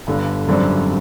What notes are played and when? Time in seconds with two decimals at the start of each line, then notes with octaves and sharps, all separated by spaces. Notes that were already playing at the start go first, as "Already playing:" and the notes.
0.07 G1 G2 D3 G3
0.47 G#1 F#2 D3 G3 C4